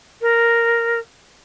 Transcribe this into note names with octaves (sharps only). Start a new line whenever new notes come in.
A#4